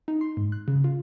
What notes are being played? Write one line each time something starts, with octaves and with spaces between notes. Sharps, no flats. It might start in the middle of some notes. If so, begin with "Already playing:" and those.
D#4
C6
G#2
F#6
C#3
F4